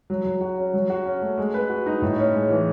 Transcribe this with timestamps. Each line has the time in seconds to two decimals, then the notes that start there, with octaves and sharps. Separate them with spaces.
0.10 F#3
0.25 F#3
0.41 F#4
0.58 C#4
0.74 F#3
0.90 F#4
1.05 C#4
1.22 A3
1.38 G#3
1.54 B4
1.70 F#4
1.86 D#4
2.02 A2
2.18 C#4
2.34 G#3
2.50 E3